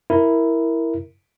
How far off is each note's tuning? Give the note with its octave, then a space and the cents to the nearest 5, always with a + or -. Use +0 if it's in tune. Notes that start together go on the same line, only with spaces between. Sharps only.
E4 +0 A#4 +0